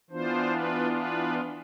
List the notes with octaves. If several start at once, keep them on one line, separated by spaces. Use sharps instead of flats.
E3 B3 D4 F4 C5
B4
B4